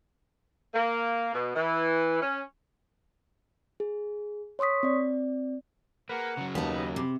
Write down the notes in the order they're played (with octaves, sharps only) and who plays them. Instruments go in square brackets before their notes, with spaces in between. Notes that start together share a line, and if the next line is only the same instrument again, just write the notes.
[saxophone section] A#3
B2
E3
C#4
[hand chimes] G#4
C#5 C6 C#6 D#6 B6
C4 D5
[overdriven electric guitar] A#3 [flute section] G#4 F#5 A#5 [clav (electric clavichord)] B4
[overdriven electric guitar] C#3 F#3
[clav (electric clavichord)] D#2 [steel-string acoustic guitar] B3 D#4 [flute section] A5
[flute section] G4 D#5 B5
[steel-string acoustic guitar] C3 [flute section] B5 D6